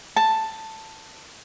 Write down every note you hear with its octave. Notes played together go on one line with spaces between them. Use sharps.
A5